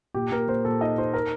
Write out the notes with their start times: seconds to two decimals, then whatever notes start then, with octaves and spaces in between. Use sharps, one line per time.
0.14 A#2 G4
0.31 A#2 A#4
0.48 A#2 C5
0.65 A#2 A4
0.81 D#4 D#5
0.98 D#4 C5
1.14 A#4